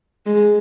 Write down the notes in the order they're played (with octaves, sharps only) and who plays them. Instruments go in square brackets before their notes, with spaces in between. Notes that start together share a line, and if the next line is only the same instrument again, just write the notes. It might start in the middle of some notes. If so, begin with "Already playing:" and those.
[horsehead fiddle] G#3